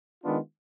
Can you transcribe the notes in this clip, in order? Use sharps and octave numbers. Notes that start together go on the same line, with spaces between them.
D#3 G#3 B3 D4 F4